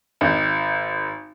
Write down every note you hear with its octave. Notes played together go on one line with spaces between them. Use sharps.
G#1